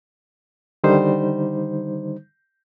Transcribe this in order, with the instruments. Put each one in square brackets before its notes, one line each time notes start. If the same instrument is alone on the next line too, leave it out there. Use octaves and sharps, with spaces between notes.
[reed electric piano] D3 D#3 G3 D#4 C5